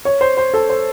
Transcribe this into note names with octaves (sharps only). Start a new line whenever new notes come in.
C#5
C5
C5
A4
C5